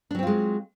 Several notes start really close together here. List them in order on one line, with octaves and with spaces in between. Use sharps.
D4 F#3 C4 F4 G#3